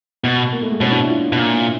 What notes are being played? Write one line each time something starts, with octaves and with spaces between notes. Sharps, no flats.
B2 B3
A#3
A3
G#3
B2 C#4
D4
E4
F4
B2
A#2